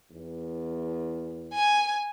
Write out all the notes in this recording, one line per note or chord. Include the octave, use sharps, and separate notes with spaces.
E2
G#5